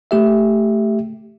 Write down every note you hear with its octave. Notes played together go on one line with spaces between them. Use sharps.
A3 G4 E5